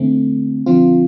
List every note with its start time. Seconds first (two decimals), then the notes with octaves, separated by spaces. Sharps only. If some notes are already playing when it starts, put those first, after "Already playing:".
Already playing: D3 A3 C4
0.66 D3 F3 C4 F4